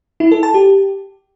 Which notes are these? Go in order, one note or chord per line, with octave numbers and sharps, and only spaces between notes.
E4
A4
A5
G4